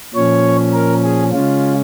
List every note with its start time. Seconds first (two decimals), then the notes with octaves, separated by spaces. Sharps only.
0.14 A#2 F3 C#4 C#5
0.73 A#4
1.03 G#4
1.32 C#3 G#3 C#4 F4